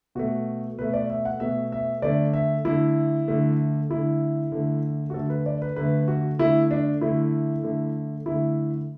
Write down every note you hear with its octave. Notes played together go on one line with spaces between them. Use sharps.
B2 A3 F#4
B2 A3 B4
D5
E5
F#5
B2 A3 E5
E5
D3 A3 D5
E5
D3 A3 E4
D3 A3
D3 A3 E4
D3 A3
F#4
D3 A3 A4
B4
D5
B4
D3 A3 B4
F#4
D3 A3 E4
D4
D3 A3 E4
D3 A3
D3 A3 E4